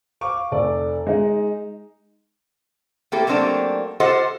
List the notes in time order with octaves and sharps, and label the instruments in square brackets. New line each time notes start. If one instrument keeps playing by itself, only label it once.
[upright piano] F5 C#6 D6
F1 A4 D5
G#3 D#4
[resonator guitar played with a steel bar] A3 A#3 C4 E4 G4 A4
F#3 A3 A#3 C4 D4 G4
F4 G4 A4 C5 D#5 F#5